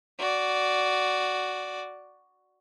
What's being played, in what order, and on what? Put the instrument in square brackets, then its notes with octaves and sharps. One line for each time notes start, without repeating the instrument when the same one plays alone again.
[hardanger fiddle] F#4 D5